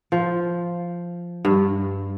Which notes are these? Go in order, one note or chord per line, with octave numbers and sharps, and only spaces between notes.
F3
G2